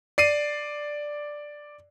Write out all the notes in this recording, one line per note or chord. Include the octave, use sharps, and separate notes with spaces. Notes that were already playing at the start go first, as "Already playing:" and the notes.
D5 C7 D#7